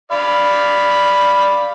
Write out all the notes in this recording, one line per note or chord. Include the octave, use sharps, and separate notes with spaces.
D5 F5 B5